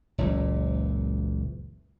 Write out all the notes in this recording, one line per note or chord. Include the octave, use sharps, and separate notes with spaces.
F#1 C#2 A#2 E3